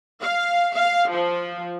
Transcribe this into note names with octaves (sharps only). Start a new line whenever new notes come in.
F5
F5
F3